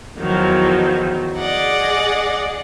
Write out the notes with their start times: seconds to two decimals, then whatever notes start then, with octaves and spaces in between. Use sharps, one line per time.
0.17 E2 D#3 F3 F#3
1.37 G#4 D5 D#5 F#5